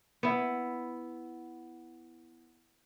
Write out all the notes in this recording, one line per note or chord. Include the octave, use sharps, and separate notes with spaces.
B3 E4